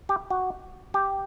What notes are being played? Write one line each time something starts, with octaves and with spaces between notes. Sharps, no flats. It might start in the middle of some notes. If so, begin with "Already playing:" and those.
G4
F#4
G4